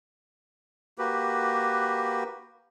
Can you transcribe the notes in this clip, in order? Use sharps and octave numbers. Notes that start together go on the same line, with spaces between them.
A#3 F#4 G4 B4